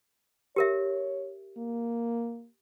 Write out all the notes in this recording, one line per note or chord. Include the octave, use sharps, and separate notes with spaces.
G4 A#4 C#5 E5
A#3